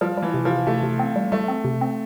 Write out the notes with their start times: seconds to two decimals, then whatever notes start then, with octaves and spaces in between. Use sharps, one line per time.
0.01 F3 G3
0.18 E3 G3
0.34 C3
0.45 C3 F3
0.67 C3 A3
0.83 C3
0.99 C4
1.16 G3
1.32 G3 A3
1.48 C4
1.65 C3
1.81 C4